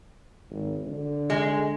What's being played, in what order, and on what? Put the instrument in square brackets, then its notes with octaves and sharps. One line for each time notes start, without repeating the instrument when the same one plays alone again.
[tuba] G#1
D3
[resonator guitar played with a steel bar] G#3